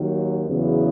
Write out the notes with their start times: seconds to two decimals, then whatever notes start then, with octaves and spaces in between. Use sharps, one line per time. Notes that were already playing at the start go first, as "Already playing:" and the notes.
Already playing: D#2 D#3 F#3
0.48 E2 C#3 F#3 B3 E4